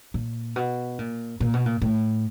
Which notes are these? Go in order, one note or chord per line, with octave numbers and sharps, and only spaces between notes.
A#2
B2
A#2
A#2
B2
A#2
A2